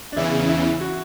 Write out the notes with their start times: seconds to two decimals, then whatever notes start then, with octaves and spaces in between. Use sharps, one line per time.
0.12 D4
0.16 E2 C#3 E3 E4
0.48 E4
0.81 F#4